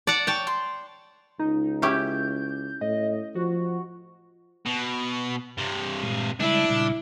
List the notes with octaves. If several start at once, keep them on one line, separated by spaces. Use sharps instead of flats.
D5 F#5 A5
C#5 G5 A5
C6
C#2 D#4
C#4 E4 G4 G6
A2 D#5
F3 F#4
B2
G2 C3
A#2 G#3
C#3 G3 G#3 D4 E4
A#2 C#3 G3